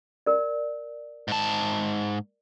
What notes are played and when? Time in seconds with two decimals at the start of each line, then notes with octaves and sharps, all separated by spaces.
0.26 A#4 D5
1.28 G#2 A5